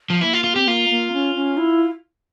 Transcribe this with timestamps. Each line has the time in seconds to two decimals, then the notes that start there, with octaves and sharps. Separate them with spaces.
0.10 F3
0.21 A#3 E4
0.33 F4
0.44 F4
0.56 C4 G4
0.67 A#3 F4
0.90 A#3
1.12 C#4
1.36 C#4
1.57 E4